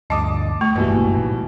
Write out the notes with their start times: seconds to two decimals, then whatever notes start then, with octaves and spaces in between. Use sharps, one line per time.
0.10 D2 G2 D3 D#5 A5 D6 D#6
0.61 A3 C#6
0.76 G1 C2 G#2 B2 E3 G3 A#3
1.14 A1 A#2 D#3